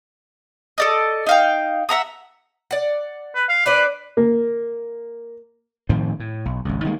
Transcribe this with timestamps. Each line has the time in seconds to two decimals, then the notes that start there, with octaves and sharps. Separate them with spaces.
0.78 A4 D5 D#5
1.27 D#4 F5 G5
1.89 E5 F#5 A#5 D#6
2.71 D5 F#5
3.35 B4
3.49 F5
3.66 D4 B4 C5 D5
4.17 A#3
5.89 A2 D#3 F3 C4
6.20 A2
6.45 B1
6.65 G#1 C#2
6.84 D#3 G3 G#3 A#3